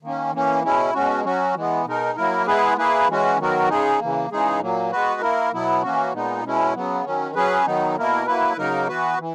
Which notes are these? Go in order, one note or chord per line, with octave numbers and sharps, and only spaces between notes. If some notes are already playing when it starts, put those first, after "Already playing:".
D#3 A#3 C#4
E3 A#3 C#4
B2 G#3 C#4 E4
B2 G#3 C#4 F#4
F#3 C#4 F#4
E3 G#3 B3
B2 G#3 D#4 A#4
F#3 A#3 E4 A#4
G#3 B3 E4 G#4 B4
A#3 E4 G#4 B4
E3 G#3 C#4 F#4
D#3 F#3 B3 F#4 A#4
C#3 G#3 D#4 G#4
C#3 E3 A#3
C#3 E3 G#3 D#4 G#4
A#2 F#3 A#3
G#3 B3 F#4 B4
A#3 E4 A#4
B2 F#3 B3 E4
E3 A#3 C#4 F#4
A#2 G#3 B3 D#4
B2 G#3 C#4 E4
C#3 F#3 B3
D#3 F#3 C#4
F#3 C#4 G#4 B4
D#3 F#3 B3 D#4
B2 A#3 E4 A#4
F#3 A#3 E4 B4
C#3 F#3 A#3 D#4 A#4
E3 B3 F#4 B4
E3